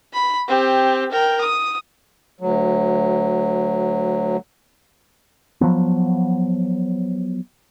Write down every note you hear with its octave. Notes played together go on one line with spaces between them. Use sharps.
B5
C4 G4
A#4 G5
D#6
D2 F#3
F3 F#3 B3